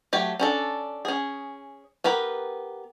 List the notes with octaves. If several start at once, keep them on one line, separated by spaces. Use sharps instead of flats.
F#3 A3 G4
C#4 D4 A4
C#4 G#4
B3 G4 A#4 B4